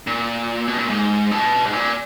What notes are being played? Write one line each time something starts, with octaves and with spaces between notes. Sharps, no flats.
A#2
B2
A#2
G#2
B2
G#2
A#2